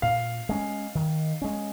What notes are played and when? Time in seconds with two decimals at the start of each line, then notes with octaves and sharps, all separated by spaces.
0.02 A#2 F5
0.49 G#3 C#4
0.95 D#3
1.42 G#3 C#4